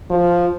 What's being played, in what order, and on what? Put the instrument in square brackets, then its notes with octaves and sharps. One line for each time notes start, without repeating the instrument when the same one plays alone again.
[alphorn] F3